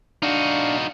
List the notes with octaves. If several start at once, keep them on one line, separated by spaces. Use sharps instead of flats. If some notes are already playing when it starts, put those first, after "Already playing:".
D4 D#4 F#4 F5